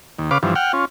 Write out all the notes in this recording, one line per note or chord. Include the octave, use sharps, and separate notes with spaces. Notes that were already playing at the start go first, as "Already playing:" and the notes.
D#2
C#3 B4 F5 D6
G2 E3 F3
F#5 G5 F6
C#4 F4